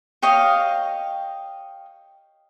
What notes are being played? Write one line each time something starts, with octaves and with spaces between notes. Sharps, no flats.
G4 C#5 D#5 F5